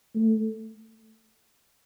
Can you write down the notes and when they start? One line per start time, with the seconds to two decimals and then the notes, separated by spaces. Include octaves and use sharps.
0.15 A3